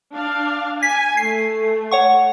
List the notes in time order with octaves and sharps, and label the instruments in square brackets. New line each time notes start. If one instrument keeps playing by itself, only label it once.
[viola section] D4 F5
[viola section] G#5 [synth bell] B6
[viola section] A3 [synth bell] C7
[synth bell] C#5 F#5 C#6